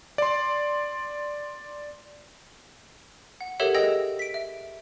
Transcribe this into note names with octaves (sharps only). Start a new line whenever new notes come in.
D5 C6
F#5
G4 A4 A#4 C#5 E5 F#5
G#4 D#5 G5 E6 A#6
B6 D7
E5